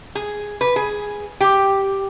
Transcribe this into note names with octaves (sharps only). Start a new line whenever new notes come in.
G#4
B4
G#4
G4